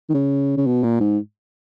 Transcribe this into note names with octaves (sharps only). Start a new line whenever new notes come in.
D#3
C#3
C#3
B2
A#2
G#2